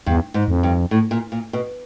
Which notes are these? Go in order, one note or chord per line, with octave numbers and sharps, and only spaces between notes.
E2 G2
G#2
F2
G2
A2
A#2
A#2
B2